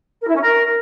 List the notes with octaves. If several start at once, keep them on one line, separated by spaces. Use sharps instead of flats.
A#4
E4
C#4
A#4